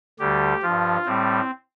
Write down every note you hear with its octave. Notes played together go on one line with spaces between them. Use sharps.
D2 D3 G3 G4
G2 F3 F4
A2 G3 C4